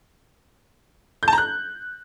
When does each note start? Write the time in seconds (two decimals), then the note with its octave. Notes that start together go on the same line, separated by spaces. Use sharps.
1.23 G6
1.28 A5
1.33 A#5
1.38 F#6